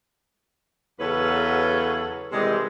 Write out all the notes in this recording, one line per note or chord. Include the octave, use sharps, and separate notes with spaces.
E2 C#3 F#3 A4 B4 C#5
C3 D#3 E3 G3 G#3